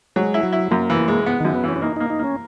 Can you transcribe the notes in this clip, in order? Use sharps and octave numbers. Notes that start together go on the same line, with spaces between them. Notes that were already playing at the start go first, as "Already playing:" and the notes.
F#3 G#3
E4
F#3
E4
F#2 A#3
E3
G#3
B3
F#2 D#3
B3
E3 C#4
C#4
A#3 D#4
A#3 D#4
D#4
A#3 C#4